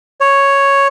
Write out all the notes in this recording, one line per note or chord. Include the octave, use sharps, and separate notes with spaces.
C#5